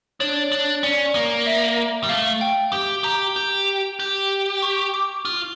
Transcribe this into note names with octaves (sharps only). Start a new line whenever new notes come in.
D4 C#5
D4
C#4 D5
A#3
E5
G3
A3 F5
G5
G4
G4 A#5
G4
G4
C#6
D6
F4